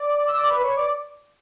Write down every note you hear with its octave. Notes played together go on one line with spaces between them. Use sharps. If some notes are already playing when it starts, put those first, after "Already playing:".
Already playing: D5 D6
E6
D5 D6
B4 B5
C#5 C#6
D5 D6